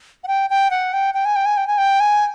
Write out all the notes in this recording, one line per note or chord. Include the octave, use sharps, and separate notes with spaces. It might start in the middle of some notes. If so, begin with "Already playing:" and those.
F#5
G5
G5
F#5
G5
G5
G#5
G5
G#5
G5
G#5
G5
G#5